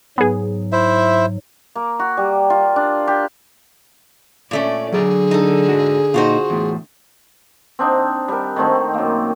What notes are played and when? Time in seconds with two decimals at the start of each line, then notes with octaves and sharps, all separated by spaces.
0.18 G#2 F#3 B3 G#4
0.72 E4 C5 E5
1.75 A#3
1.99 F#4
2.17 G3
2.50 F4
2.76 D4
3.07 G4
4.51 A#2 A3 C#4 D5
4.92 D3 F#3 G#4 D5
5.31 D#4 A4
5.68 G#2 F#4
6.14 A#2 D#4 F4 F#4 C5
6.50 E2 A2
7.79 C4 D4 D#4
8.28 G3 A#4
8.56 D#3 A3 C4 D#4
8.94 F#2 A#3